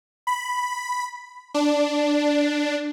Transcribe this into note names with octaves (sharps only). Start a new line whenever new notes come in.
B5
D4